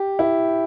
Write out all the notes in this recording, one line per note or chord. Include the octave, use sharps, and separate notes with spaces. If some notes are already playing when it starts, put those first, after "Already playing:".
Already playing: G4
E4